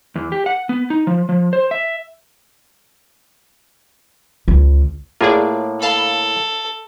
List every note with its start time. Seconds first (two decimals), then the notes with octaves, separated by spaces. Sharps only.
0.16 E2
0.32 G4
0.46 F#5
0.69 B3
0.90 D#4
1.07 F3
1.29 F3
1.53 C5
1.71 E5
4.48 C#2
5.21 A2 A#3 F4 G#4 D5
5.82 A4 F5 A5 B5